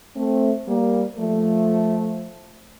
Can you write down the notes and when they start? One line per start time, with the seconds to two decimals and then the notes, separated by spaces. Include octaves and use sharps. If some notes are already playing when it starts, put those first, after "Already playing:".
0.17 A3 C4
0.68 G3 A#3
1.19 F3 A3